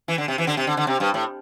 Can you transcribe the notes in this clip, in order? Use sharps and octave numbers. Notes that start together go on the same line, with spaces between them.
E3
D3
C3
E3
D3
C3
D3
D3
C3
G2
A2